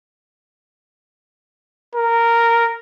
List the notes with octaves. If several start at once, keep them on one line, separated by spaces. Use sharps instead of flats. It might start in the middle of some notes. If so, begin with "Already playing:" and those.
A#4